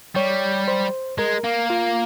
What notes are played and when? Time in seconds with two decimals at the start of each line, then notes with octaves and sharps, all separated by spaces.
0.16 G3 C#5
0.68 C5
1.18 G#3 A#4
1.44 A#3
1.70 F4